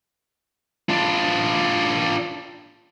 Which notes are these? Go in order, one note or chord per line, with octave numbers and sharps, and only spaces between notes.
D4 F4